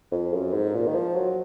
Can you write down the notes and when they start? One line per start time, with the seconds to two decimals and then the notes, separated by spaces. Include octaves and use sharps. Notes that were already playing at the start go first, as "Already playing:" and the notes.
0.11 F2
0.33 F#2
0.53 G#2
0.74 A#2
0.87 D#3
0.95 F3
1.15 F#3